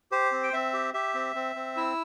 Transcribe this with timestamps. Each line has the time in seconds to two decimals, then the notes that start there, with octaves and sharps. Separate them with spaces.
0.12 G4 C5
0.32 C4
0.43 G5
0.53 C4 E5
0.73 G4
0.94 G4 E5
1.14 C4
1.35 C4
1.56 C4
1.76 E4 E6